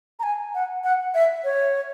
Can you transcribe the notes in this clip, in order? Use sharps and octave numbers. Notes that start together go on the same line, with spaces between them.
A#5
G#5
F#5
F#5
E5
C#5